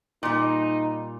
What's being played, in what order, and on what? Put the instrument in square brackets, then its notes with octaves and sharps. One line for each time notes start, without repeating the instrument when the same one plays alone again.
[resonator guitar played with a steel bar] A#2 G3 [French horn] D#4